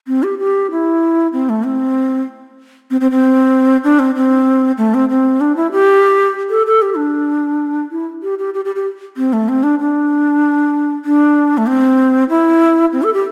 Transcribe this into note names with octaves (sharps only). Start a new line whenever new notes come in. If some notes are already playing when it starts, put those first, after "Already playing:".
C4
G4
G4
E4
C4
A3
C4
C4
C4
C4
D4
C4
C4
A3
C4
C4
D4
E4
G4
A4
A4
G4
D4
E4
G4
G4
G4
G4
G4
C4
A3
C4
D4
D4
D4
A3
C4
E4
C4
A4
G4